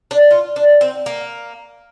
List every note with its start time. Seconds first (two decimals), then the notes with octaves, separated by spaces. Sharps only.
0.11 D4
0.31 F4
0.56 D4
0.81 C4
1.06 A#3